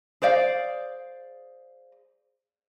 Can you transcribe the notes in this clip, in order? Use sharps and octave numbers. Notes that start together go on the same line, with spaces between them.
G#4 C5 D5 F5